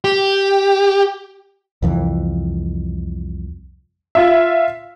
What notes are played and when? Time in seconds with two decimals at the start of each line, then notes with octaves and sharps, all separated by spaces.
0.04 G4
1.82 C2 F2 E3
4.15 F4 E5